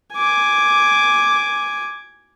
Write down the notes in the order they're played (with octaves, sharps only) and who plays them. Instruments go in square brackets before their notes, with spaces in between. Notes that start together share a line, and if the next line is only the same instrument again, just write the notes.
[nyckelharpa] G#5 D6